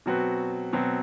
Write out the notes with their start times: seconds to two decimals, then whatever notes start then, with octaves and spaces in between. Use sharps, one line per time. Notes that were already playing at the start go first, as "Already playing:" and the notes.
0.06 B2 F#3 C4 F#4 B4
0.73 B2 F#3 C4 F#4 B4